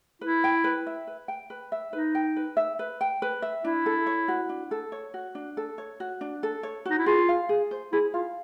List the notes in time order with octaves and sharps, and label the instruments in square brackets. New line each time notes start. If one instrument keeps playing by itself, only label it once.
[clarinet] E4 [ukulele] B4
[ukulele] G5
B4
E5
B4
G5
B4
E5
[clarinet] D#4 [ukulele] B4
[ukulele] G5
B4
E5
B4
G5
B4
E5
[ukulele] D4 [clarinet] E4
[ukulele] A4
C#5
F#4
D4
A4
C#5
F#4
D4
A4
C#5
F#4
D4
A4
C#5
[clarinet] D#4 [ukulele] F#4
[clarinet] E4
[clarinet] F4 [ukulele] G#4
[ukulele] F5
G#4
C5
[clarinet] E4 [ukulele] G#4
[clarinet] F4 [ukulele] F5